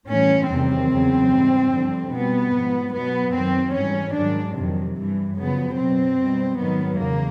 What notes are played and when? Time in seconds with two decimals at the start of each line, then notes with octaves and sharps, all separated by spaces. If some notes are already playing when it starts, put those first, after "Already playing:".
0.08 A2 E3 G3 C#4
0.49 E2 C3 D#3 G3 C4
0.90 E2 C#3 F#3
1.30 G#2 E3 G3
1.71 G2 D3 F3
2.12 B2 G3 B3
2.53 G#2 F3
2.93 B2 F#3 B3
3.33 F#2 D#3 F#3 C4
3.74 G#2 E3 G3 C#4
4.14 G#2 D#3 F#3 D4
4.56 F2 C3 D#3 F#3
4.96 G2 E3 G3
5.37 F#2 C#3 F3 B3
5.77 B2 F#3 C4
6.17 B2 G3
6.59 G#2 D#3 F#3 B3
6.99 E2 C#3 A#3